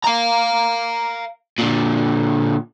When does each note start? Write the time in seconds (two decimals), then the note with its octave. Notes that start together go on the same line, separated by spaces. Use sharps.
0.05 F5 A#5
1.58 A#2 D3